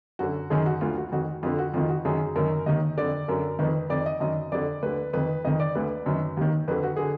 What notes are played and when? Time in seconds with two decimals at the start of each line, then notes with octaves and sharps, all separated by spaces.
0.19 F#2 D3 F#4
0.50 F#2 D#3 G#4
0.66 F#4
0.81 D2 D3 F4
0.97 F#4
1.12 F2 D#3 F#4
1.43 F2 D3 F4
1.59 F#4
1.74 F2 D#3 F4
1.89 F#4
2.05 F#2 D#3 G#4
2.36 F#2 D#3 A#4
2.66 D#2 D#3 D#5
2.97 F2 D3 D5
3.28 F#2 D3 A#4
3.59 F2 D#3 B4
3.90 F2 D#3 D5
4.06 D#5
4.20 F#2 D#3 D#5
4.52 F2 D3 D5
4.82 D2 D3 B4
5.13 F2 D#3 B4
5.45 F2 D#3 D#5
5.60 D5
5.75 D2 D3 B4
6.06 F#2 D#3
6.37 D#2 D#3
6.68 F2 D3 B4
6.83 F#4
6.97 D3 G#4